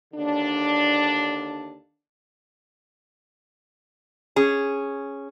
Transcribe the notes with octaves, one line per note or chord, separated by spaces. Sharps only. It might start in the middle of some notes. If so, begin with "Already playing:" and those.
D#2 D3 D4
C#4 G#4